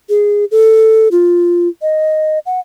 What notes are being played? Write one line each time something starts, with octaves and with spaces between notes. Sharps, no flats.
G#4
A4
F4
D#5
F#5